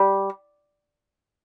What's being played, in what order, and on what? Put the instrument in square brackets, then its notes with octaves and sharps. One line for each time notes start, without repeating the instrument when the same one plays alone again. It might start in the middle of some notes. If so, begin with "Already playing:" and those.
Already playing: [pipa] G3